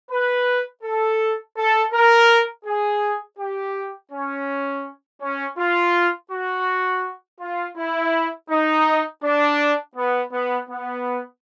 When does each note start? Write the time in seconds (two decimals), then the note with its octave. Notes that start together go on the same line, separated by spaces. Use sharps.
0.10 B4
0.84 A4
1.57 A4
1.93 A#4
2.66 G#4
3.39 G4
4.12 C#4
5.21 C#4
5.58 F4
6.31 F#4
7.40 F4
7.77 E4
8.50 D#4
9.23 D4
9.96 B3
10.32 B3
10.70 B3